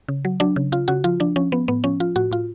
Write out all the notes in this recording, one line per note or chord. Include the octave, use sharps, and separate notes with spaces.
C#3
F#3
F#3 D4
C#3
C#3 F4
C#3 F#4
F3 F4
F3 D4
F3 C#4
F3 B3
A2 B3
F3 C#4
F3 F4
A2 F#4
A2 F4